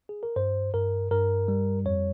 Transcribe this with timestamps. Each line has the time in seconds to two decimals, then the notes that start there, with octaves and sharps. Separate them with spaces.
0.09 G#4
0.23 A#4
0.36 G2 C5
0.74 G2 A#4
1.11 G2 A#4
1.48 G3
1.86 F2 C#5